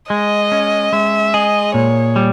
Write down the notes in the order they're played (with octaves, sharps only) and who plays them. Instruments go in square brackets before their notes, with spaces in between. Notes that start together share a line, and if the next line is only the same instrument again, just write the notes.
[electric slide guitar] G#3 [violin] D#5
[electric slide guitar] C#4
[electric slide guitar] G#3 [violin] E5
[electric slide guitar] G#4 [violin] D#5
[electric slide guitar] A#2 [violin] C#5
[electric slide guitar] G3